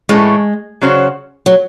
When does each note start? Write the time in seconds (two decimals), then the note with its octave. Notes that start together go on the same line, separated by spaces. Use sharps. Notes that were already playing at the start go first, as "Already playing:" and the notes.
0.09 A2 E3 G#3 A3 C#4
0.82 C#3 F#3 C#4 F#4 C5
1.46 F#3